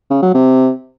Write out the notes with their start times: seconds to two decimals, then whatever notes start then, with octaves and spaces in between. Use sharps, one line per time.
0.10 C#3
0.22 F#3
0.34 C3